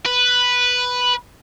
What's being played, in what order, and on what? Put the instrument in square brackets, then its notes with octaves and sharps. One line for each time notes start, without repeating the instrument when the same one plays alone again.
[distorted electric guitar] B4